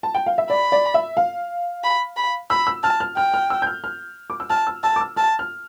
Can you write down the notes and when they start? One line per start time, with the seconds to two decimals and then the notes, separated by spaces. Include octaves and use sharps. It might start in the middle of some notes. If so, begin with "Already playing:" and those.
0.03 A5
0.14 G5
0.26 F5
0.38 E5
0.50 D5 B5
0.72 D5
0.94 E5
1.17 F5
1.84 B5
2.17 B5
2.50 B5 E6
2.67 E6
2.83 A5 F6
3.00 F6
3.17 G5 F6
3.34 F6
3.50 E6
3.62 G6
3.67 F6
3.84 F6
4.30 D6
4.40 E6
4.50 A5 F6
4.67 E6
4.83 A5 E6
4.96 D6
5.00 E6
5.16 A5 F6
5.39 F6